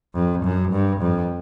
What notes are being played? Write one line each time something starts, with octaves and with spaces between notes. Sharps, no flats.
F2
F#2
G2
F2